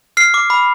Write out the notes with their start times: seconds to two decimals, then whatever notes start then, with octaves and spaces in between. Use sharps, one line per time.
0.17 F6 C7
0.34 D6
0.50 B5